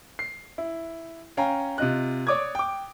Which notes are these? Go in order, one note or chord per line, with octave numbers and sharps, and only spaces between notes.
C7
E4
C#4 F5 G5 G#5 A#5
C3 F4 D#5 F#6
C#5 D5 D6 D#6 G#6
G5 D6